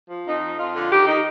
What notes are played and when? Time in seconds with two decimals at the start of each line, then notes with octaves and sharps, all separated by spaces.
0.09 F3
0.26 F2 D#4
0.43 F3
0.58 F2 F4
0.75 D3
0.91 D#3 G4
1.07 D#3 D#4